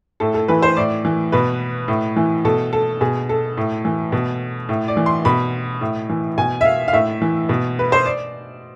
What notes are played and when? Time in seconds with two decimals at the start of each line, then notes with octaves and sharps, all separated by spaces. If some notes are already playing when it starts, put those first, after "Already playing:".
0.20 A2 A4
0.34 A4
0.48 E3 B4
0.63 C5
0.77 A2 D5
1.05 E3
1.32 B2 B4
1.88 A2
2.16 E3
2.45 B2 A4
2.73 A4
3.01 B2 G#4
3.29 A4
3.57 A2
3.85 E3
4.12 B2
4.69 A2
4.88 D5
4.97 E3
5.06 C6
5.25 B2 B5
5.81 A2
6.10 E3
6.38 B2 G#5
6.61 E5
6.65 F5
6.88 F5
6.93 A2 E5
7.22 E3
7.49 B2
7.79 B4
7.92 C5
8.05 D5